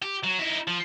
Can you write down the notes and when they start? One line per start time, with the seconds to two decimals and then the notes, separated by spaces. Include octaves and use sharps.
0.02 G4
0.24 F#3
0.39 D#4 E4
0.67 F3